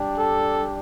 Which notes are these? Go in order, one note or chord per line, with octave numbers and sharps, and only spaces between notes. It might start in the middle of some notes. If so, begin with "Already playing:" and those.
Already playing: G3 D4 G4
A4